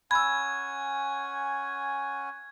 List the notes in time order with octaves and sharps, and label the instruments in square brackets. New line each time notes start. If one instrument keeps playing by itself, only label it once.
[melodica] C#4 F#5 G#5 [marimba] B5 E6 [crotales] G#6